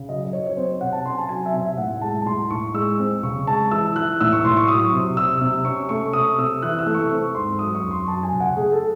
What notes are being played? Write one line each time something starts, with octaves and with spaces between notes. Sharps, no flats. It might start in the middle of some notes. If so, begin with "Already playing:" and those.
Already playing: C#3
F#3 D#5
D#5
F#3 C#5
C#5
C4 C5
C3 F#5
A5
C#4 C6
G#5
A5
F#3 G#5
E5
C3
E5
A2 F#5
G#3 A5
A5
A2 C6
A2 C#6
G#3 E6
C4
C#3 C#6
G#3 A5
E3 E6
E3 F#6
A2 E6
C#6
A2 C6
C#6
F#3 D#6
C3
C3 E6
C3
C#4 C#6
A3 C#6
C3 D#6
C3 E6
E3 F#6
E6
A3
C#6
C4
G#2 C6
F#3 D#6
C#6
F#2
C6
F#3 A5
G#5
C#3
F#5
A3 G#4
A4